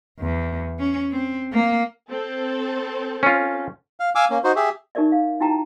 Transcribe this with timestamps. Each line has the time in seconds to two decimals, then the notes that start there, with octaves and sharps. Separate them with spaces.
0.19 E2
0.79 C#4
1.11 C4
1.53 A#3
2.09 C4 A4
3.23 C#4 F4
4.00 F5
4.15 F5 G#5 D6 E6
4.30 A#3 C#4
4.44 D#4 F#4 C5
4.56 G4 G#4 E5
4.95 D#4 G4 A#4 D5 E5
5.12 F5
5.40 D#4 E4 F#4 G5 A5 A#5